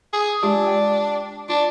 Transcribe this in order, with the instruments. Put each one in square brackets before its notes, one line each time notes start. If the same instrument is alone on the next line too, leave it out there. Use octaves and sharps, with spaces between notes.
[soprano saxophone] G#4
[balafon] G#3 F4 G4 [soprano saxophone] D4
[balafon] D5 G5
[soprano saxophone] D4 [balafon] F4